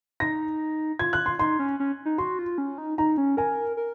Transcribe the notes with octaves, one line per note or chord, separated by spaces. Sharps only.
D#4 A#6
F4 G#6
F#6
C6
D#4 C6
C#4
C#4
D#4
F#4 C6
F4
C#4
D#4
D#4 A#5
C#4
A#4 G#5
A#4